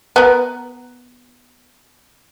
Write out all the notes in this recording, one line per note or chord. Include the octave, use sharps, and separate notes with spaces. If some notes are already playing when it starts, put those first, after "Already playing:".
B3 A#4